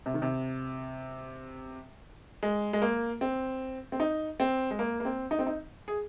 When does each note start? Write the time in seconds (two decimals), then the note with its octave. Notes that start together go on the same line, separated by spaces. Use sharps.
0.06 C3
0.14 D#3
0.22 C3
2.43 G#3
2.73 G#3
2.82 A#3
3.21 C4
3.92 C4
4.00 D#4
4.40 C4
4.71 G#3
4.79 A#3
5.00 A#3
5.05 C4
5.31 D#4
5.39 C4
5.47 D#4
5.88 G#4